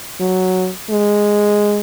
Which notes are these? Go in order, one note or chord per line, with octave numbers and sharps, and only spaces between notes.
F#3
G#3